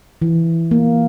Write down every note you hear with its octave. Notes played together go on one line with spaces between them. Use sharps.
E3
A#3